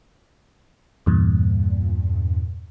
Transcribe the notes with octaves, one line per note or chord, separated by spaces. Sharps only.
E2 G2 A#2